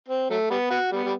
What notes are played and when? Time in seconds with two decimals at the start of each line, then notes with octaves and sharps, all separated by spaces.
0.08 C4
0.30 F#3 A3
0.50 G3 B3
0.70 B3 F#4
0.92 G3 B3
1.04 G3